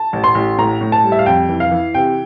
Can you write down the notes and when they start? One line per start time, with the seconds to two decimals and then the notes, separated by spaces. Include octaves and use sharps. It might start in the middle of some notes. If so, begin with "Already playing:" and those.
Already playing: A5
0.13 A1
0.24 C6
0.35 A1
0.58 A2 A#5
0.81 A2
0.92 A5
1.04 G3
1.12 E5
1.19 F5
1.26 F2 G5
1.49 E3
1.60 F5
1.71 E3
1.94 C3 G5